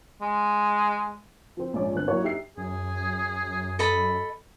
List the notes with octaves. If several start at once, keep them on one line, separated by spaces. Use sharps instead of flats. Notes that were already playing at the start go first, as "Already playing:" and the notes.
G#3
F3 C4
A#1 G#2 C#4 D5 D6
G1 C4 F#6
F#3 A#3 E4 F#4 C#5
D#4 G4 E5 C7
F#2 G#4
A4 D#5 B5